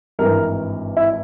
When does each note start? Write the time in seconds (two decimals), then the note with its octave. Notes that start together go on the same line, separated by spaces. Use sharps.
0.19 G#1 G2 E3 A#4
0.97 E4